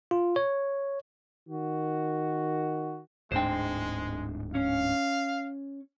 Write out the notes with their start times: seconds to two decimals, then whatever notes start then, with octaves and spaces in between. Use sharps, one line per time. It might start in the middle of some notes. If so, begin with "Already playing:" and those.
0.11 F4
0.36 C#5
1.49 D#3 F#4
3.32 D1 G#2 G#3 D4 C5 G5
4.55 C#4 F5